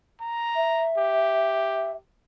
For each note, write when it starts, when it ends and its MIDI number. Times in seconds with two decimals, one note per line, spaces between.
0.21 0.89 82
0.56 1.92 76
0.97 1.99 67